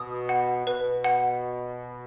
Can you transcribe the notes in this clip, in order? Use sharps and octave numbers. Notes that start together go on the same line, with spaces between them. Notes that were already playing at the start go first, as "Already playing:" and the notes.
Already playing: B2 D#6
F#5
B2 B4
F#5